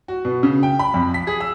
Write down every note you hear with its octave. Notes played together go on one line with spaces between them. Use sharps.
F#4
B2
C#3
G5
B5
F2
B6
G#4
E6